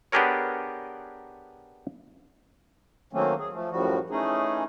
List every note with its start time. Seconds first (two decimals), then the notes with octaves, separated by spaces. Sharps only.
0.12 B3 D4 G4 G#4 A#4 C#5
3.13 D#3 F#3 A3 A#3 C4 C#4
3.39 G#4
3.53 F3 A3
3.71 F#2 A2 F3 G3 F#4
4.10 E3 A3 C#4 D#4 G#4